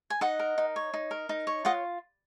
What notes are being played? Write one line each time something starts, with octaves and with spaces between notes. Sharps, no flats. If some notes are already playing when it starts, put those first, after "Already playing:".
G#5
D#4 D#5 F#5
A#4
D#4
C#5
D#4
A#4
D#4
C#5
F4 D#5 F#5